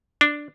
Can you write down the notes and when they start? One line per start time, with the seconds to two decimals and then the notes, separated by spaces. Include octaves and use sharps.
0.21 D4